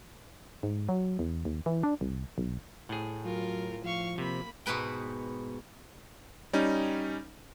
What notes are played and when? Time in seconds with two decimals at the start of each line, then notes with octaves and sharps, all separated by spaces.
0.63 G#2
0.89 F#3
1.19 E2
1.45 D#2
1.66 E3
1.83 D4
2.01 C2
2.38 B1
2.89 A2 G#4
3.24 F#3 F4 A#4
3.84 F3 F5 C#6
4.18 C3 A#3 B5
4.66 G#2 B2 B3 B4 G5
6.53 G3 C#4 D#4